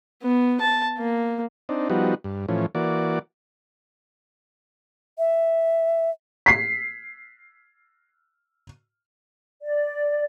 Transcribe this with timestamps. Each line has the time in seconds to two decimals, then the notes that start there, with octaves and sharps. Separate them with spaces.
0.23 B3
0.61 A5
0.98 A#3
1.69 C4 D4 D#4
1.90 F3 G3 B3 D#4 F#4
2.24 G2
2.48 A2 E3 F3 C#4
2.75 E3 A#3 F#4 D5
5.18 E5
6.46 B6 C7
9.62 D5